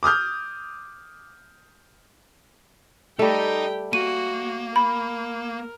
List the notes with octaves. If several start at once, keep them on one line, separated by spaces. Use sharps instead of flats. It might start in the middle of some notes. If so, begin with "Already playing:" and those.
D6 D#6 F6 G6
G3 A3 D#4 G4 D#5 G5
A#3 F#4 D#7
A#4 B5